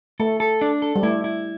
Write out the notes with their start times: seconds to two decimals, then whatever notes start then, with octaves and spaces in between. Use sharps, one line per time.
0.20 A3 A4
0.40 A4
0.61 D4
0.82 A4
0.96 G3
1.03 A3 E4
1.24 E4